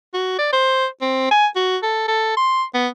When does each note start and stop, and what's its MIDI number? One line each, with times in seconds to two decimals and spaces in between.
0.14 0.36 66
0.39 0.50 74
0.53 0.86 72
1.02 1.27 60
1.31 1.47 80
1.56 1.77 66
1.83 2.07 69
2.08 2.33 69
2.37 2.64 84
2.74 2.88 59